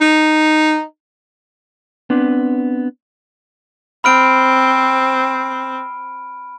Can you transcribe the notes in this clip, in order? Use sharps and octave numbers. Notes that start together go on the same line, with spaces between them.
D#4
B3 C4 D4
C4 B5 F6 D7